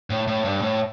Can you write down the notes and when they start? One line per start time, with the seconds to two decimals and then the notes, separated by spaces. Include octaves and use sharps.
0.10 A2
0.27 A2
0.45 G2
0.61 A2